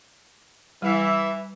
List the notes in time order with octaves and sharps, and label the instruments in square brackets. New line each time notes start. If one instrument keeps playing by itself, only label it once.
[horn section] E3 E5 [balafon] G3